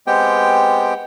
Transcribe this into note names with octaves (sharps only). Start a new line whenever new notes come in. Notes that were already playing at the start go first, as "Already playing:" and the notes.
G#3 B3 C4 G4 G5